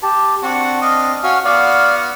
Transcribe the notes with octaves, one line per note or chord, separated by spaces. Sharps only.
G4 A5
C4 D4 F#4 F#5
D4 D#5 F5
C#4 F#4 F5 G#5
B3 F#4 D5 F5 F6